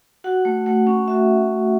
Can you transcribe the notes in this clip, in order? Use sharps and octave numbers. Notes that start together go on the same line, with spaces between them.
F#4 F#5
A3
A3 F#5
C#4
F#4 E5